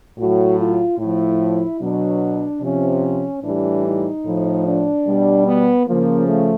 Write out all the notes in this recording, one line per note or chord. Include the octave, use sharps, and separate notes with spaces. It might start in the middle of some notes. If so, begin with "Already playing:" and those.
A2 F#3 F#4
F4
A2 F3 E4
B2 F#3 D4
C3 F3 C#4
A2 E3 G3 D4
D#4
A2 F3
D4
B2 G3
B3
C#3 F3 A#3
A3